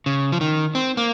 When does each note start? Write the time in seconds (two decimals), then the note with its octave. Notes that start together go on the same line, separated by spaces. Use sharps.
0.06 C#3
0.32 F3
0.41 D#3
0.75 C4
0.97 A#3